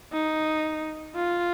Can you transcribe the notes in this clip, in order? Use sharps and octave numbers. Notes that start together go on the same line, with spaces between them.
D#4
F4